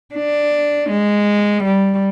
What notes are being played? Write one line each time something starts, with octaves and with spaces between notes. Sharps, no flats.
D4
G#3
G3